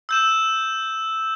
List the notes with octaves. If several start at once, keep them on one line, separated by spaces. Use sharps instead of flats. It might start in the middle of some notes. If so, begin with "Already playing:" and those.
E6 G6 E7